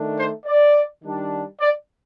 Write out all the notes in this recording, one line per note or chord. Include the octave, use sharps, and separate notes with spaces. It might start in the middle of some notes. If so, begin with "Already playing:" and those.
Already playing: D#3 A3 D4
C5
D5
D#3 G3 D4
D5